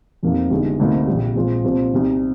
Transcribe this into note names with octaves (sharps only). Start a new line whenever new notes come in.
F1 F2 C3 D#3 A#3
G1 G2 D#3 G#3
D2 C3 G3 A#3 D#4
A#1 A#2 G3
A#1 A#2 G#3 C4 F4
C2 A#2 F3 C4
C2 C3 D#3